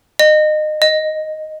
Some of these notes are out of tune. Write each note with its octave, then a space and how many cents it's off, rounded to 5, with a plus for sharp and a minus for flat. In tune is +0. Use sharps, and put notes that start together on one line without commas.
D#5 -25
D#5 +0